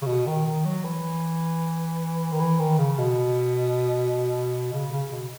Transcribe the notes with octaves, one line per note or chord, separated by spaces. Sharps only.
C#3
B2
D#3
D#3
F#3
E3
D#3
E3
D#3
C#3
B2
C#3
C#3
B2